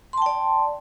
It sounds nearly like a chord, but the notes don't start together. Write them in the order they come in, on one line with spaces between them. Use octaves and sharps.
C6 A5 G5 D5